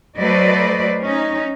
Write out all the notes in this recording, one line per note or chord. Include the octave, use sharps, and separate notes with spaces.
F#3 A3 B4 C5 D5 D#5
C#4 D#4